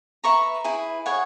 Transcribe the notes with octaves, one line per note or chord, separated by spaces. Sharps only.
B4 E5 A#5 C#6
E4 G#4 B4
G#4 C#5 F#5